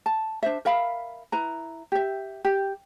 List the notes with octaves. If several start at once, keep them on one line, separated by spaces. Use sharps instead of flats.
A5
D4 C5 E5
A#4 E5 F5 B5
E4 B4 A#5
G4 E5
G4